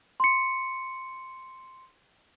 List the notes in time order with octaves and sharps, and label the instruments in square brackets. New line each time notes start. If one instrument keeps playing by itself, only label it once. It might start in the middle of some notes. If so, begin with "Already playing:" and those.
[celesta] C6 C#7